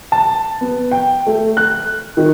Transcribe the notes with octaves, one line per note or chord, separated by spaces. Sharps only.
A5
B3
G5
A3
F#6
D#3